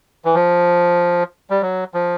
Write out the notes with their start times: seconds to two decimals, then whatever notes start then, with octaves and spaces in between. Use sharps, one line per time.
0.25 E3
0.34 F3
1.50 G3
1.62 F#3
1.94 F3